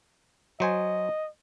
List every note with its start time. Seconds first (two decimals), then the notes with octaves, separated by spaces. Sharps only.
0.60 F#3 C5 D#5 G#5